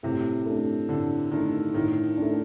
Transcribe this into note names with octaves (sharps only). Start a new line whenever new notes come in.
A2 C3
A3 D4
A2 D3
D#3 A3 D4
A2 D#3
A3 D4